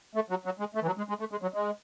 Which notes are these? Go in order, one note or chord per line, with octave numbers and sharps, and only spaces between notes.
A3
F#3
F#3
G#3
A3
E3
F#3
G#3
G#3
A3
G#3
F#3
G#3